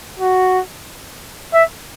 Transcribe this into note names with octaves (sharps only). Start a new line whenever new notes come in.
F#4
E5